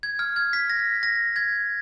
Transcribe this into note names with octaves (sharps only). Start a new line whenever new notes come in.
G#6
F6
G#6
B6
A#6
A#6
G#6